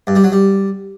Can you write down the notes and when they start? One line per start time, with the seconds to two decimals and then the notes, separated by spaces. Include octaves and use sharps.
0.07 G2
0.15 G3
0.24 F#3
0.32 G3